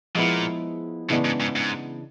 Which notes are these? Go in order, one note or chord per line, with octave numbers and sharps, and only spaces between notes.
A#2 F3 G#3 B3 E4
A2 C#3 E3 G#3 B3 D4
G#2
G#2
G#2